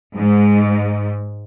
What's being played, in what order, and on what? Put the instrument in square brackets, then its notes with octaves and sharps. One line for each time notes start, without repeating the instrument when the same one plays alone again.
[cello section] G#2